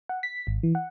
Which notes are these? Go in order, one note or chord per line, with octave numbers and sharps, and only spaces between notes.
F#5
B6
G#1
E3
F#5